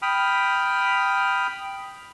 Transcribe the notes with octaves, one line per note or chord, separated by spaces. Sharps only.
G5 B5 D#6 F6